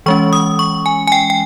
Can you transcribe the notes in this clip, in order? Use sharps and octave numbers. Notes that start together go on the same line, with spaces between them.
E3 G#3 C#4 C#6
D#6
C#6
G#5
G#5
G5
G5